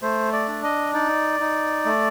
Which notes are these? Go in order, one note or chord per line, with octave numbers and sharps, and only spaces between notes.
A3 C5
D5
D4
D#5
D#4 D5
D#4
A3